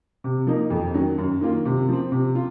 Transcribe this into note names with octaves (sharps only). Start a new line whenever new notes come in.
C3
F3 A#3 D#4
F2
D#3 F#3 C#4
F#2
D#3 A#3 F4
C3
F3 C4
C3
F4